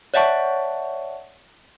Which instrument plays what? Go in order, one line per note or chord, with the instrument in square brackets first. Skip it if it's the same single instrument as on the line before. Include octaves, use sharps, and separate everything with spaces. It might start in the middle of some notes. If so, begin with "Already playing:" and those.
[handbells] C#5 D5 E5 F#5 A5 C#6